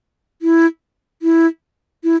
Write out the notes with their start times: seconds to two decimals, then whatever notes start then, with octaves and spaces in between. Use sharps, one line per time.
0.42 E4
1.22 E4
2.04 E4